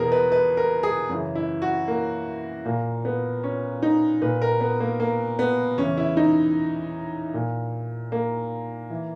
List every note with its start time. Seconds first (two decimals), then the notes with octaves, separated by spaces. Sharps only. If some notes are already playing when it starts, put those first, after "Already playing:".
Already playing: E2 B2 B3 G#4 A#4
0.12 B4
0.32 B4
0.57 A#4
0.83 G#4
1.10 F#2 C#3 E3
1.35 E4
1.62 F#4
1.88 A#3
2.65 A#2 A#3
3.05 B3
3.43 C#4
3.82 D#4
4.22 A#2 B4
4.42 A#4
4.61 B3
4.80 A#3
5.00 A#3
5.39 B3
5.78 E2 C#3 E3 C#4
5.97 E4
6.17 D#4
7.34 A#2
8.12 A#3
8.90 E3